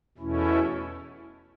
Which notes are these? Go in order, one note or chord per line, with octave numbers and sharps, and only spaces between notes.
E2 B2 A3 C#4 E4